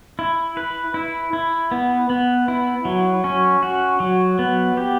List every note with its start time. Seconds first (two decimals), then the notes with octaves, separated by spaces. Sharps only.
0.19 E4
0.57 B4
0.94 E4
1.33 E4
1.71 B3
2.10 B3
2.48 E4
2.85 F#3
3.24 C#4
3.63 F#4
4.00 F#3
4.39 B3
4.77 G4